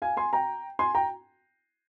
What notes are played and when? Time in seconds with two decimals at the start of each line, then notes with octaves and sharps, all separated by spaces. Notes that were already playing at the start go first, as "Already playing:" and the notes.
0.02 F5 G#5
0.17 G#5 C6
0.33 G5 A#5
0.79 G#5 C6
0.95 G5 A#5